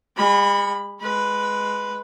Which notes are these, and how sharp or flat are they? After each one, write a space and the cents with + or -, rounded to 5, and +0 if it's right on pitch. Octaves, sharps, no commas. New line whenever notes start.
G#3 -45 B5 +0
G#3 +5 B4 +0